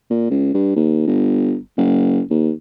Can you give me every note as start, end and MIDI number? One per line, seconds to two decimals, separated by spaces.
0.10 0.26 46
0.31 0.49 37
0.54 0.73 43
0.76 1.04 39
1.07 1.56 31
1.78 2.21 30
2.31 2.51 39